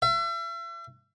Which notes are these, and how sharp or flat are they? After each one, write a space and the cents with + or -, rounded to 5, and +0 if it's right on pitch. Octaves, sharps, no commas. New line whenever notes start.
E5 +40